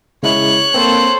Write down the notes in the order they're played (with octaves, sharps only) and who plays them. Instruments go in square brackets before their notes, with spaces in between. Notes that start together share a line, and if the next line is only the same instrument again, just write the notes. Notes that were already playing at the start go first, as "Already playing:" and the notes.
[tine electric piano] C#3 G#3 E4 [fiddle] C#5 F#6
[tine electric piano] A#3 C4 [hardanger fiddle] A4 C5